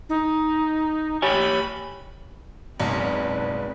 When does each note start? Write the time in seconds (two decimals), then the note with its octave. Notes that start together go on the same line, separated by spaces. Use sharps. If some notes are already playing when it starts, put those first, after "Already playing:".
0.09 D#4
1.22 G4 C#5 G#5 B5
2.80 F#1 B1 G#2 C4 B4 D5 A#5